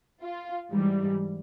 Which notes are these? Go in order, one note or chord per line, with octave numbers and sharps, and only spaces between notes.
F4
G#2 E3 G3